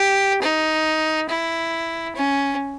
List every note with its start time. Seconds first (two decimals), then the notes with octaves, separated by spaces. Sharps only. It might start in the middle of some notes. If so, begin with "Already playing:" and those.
Already playing: G4
0.41 D#4
1.29 E4
2.16 C#4